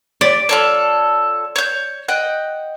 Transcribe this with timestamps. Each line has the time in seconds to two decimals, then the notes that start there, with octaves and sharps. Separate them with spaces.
0.21 G4 D5
0.49 F4 A4 C#5
1.56 C#5 G6
2.08 D#5 F#5 G5